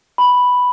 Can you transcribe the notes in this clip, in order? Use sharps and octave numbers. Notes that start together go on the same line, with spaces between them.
B5